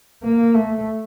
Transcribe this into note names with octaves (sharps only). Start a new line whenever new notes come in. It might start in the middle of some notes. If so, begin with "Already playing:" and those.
A#3
A3